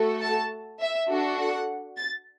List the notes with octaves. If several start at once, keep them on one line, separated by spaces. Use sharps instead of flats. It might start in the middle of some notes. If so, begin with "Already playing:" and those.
Already playing: A3 F#4 A4
A5
E5
D4 F#4 A4
F#5
A6